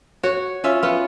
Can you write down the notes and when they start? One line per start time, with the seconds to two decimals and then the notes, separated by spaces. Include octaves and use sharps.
0.23 F#4 C#5
0.64 C#4 F4 E5
0.83 B3 F4